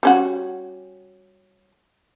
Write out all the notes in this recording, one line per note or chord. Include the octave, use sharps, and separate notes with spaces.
G3 C#4 F#4